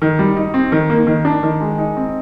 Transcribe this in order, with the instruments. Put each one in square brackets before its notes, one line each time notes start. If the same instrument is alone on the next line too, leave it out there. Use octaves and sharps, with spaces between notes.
[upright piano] D#3
G3
D#4
C4
D#3
A#3
D#3
D4
D#3
G#3
D#4
C4